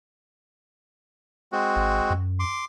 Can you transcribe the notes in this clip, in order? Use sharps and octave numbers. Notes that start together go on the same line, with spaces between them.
G#3 C4 F#4
G#1
F#2
C6 D6